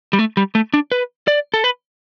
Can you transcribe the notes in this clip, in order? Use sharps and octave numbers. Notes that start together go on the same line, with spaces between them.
G3
A3
G3
A3
D4
B4
D5
A4
B4